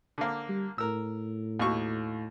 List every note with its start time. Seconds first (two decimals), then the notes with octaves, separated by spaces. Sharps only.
0.18 D3 A#3
0.49 G3
0.78 A2 A#4 E6
1.59 D#2 B2 C#6